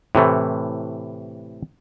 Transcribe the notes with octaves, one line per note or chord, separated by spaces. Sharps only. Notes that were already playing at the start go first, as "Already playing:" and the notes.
A2 C3 E3 A3